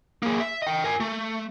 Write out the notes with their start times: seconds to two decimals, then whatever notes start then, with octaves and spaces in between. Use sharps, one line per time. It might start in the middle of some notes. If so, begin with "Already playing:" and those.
0.23 A#3 G#4
0.40 E5
0.62 D#5 G5
0.84 A#4 G#5
1.00 A3